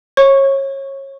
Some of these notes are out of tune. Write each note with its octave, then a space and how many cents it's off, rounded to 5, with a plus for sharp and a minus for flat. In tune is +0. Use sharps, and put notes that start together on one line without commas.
C#5 -25 C#6 +0